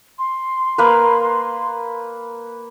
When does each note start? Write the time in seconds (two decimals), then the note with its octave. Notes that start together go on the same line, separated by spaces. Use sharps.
0.19 C6
0.78 A#3 B4